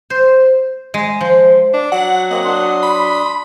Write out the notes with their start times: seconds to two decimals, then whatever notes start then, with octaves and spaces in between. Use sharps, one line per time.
0.10 C5
0.94 G#3
1.21 F3
1.74 D4
1.92 F#3 F#5
2.31 A#3 C4 D#5 F#5
2.45 D4 C6 D#6
2.83 B5